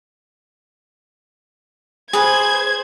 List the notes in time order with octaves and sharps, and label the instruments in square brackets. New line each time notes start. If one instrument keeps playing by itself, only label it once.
[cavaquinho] G#4 B4 [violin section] C5 G#6